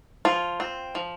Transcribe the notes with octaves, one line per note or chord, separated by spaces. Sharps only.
F3 F4
C4
F3